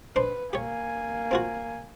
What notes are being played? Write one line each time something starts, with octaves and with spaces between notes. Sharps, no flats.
D4 B4 C5
A#3 G4 C#5 G#5
C4 F4 F#4